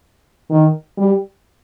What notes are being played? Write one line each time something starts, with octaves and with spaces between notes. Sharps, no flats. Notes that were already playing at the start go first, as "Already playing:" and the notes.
D#3
G3